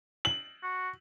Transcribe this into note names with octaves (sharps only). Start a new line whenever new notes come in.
F#7
F#4